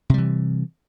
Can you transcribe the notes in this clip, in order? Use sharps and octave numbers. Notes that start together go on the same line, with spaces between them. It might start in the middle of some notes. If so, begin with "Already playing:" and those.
C3 E3 G3